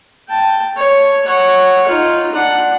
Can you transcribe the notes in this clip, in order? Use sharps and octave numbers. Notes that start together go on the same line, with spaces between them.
G5 A5
C#5
C#5 F#5
D#4 F4
D4 F#5